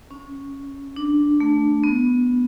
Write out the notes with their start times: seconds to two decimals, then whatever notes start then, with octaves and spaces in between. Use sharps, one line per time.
0.11 C#4
0.96 D4
1.40 A3
1.84 B3